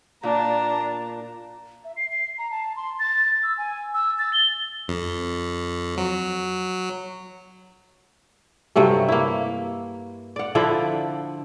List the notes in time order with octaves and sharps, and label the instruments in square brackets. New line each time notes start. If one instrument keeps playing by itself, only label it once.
[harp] A#2 [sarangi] D4 [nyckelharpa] A#5
[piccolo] E5
C7
C7
A#5
A5
C6
A6
E6
G#5
E6
A6
G7
[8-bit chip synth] F2
F#3
[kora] G2 C3 F#3 A3
A#3 E4
D5 F#5
D3 F3 E4 D5